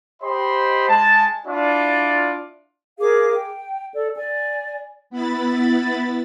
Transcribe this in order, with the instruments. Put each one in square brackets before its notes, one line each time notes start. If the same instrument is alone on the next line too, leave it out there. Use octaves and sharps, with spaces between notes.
[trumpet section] G4 C5 D#5 B5 C6
G#3 A5
D4 E4 F4 D5
[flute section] G#4 A#4 F5 D6
G5
A4 D5
D5 G#5
[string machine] B3 E4 B5 A6